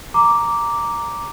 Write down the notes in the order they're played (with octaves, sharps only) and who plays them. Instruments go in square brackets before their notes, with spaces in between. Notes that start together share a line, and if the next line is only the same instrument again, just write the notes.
[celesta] A#5 D6